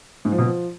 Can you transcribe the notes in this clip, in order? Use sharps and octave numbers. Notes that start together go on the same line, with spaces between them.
G#2
F3
B2
F3